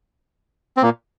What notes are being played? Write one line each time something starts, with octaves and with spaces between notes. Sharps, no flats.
C4
A#2 A#3